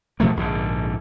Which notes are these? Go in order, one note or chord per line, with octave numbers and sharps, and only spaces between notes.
B2 F3 A3 A#3
A#1 G#2 D3